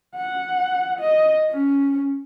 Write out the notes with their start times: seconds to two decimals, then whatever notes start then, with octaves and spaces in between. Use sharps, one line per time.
0.16 F#5
0.99 D#5
1.50 C#4